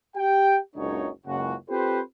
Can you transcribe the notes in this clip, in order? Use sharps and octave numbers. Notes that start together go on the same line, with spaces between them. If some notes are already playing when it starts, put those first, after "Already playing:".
G4 G5
F#1 C#2 F#2 D4 D#4 C#5
F#1 C#2 F#4
C4 F4 G4 A4 B4 C5